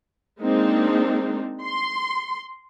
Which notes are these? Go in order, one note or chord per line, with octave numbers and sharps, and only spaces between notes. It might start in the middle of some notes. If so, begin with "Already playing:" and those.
G#3 A#3 C4 D4 D#4
C6